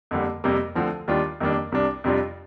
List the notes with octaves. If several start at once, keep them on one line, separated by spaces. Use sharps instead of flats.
F2 D3 G3 A#3
F2 C3 G3 A#3
D2 D3 F3 C4
D#2 D#3 G3 D4 F4
F2 D#3 G3 A#3 D4
C2 C3 G3 D4
F2 C3 G3 D4 F4